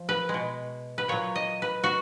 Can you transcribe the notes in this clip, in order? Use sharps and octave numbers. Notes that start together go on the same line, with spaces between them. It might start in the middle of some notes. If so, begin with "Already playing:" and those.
Already playing: F3
B4
G#3
B2
B4
A#2 F#3 C#5
D#5
B4
F#4